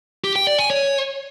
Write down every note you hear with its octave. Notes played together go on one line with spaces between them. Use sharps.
G4
G5
D5
G#5
C#5